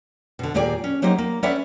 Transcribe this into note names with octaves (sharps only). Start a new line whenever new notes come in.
B2 D3
D#2 A#2 G4 G#4 D5 G#5
C#4
F#3 A#3 D#4 G4 C5 D#5
A#3
C#4 B4 C#5 D5 E5 F#5